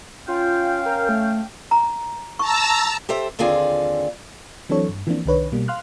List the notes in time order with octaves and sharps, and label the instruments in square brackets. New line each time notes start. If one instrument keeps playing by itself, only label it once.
[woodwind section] C#4 F5 G5 [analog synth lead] F4
[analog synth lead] A#4
A3
[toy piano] A#5
[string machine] A5 A#5 E6 [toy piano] C#6
[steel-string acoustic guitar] G4 A4 C5 E5
D#2 D3 C4 F4 G#4 D5
[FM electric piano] E3 F#3 C4 D4 A4 C#5
G2
E3 F3 A#3 C4 D4
C2 D#3 D4 B4 C#5
B2 G3 A#3
F5 C6 F6 F#6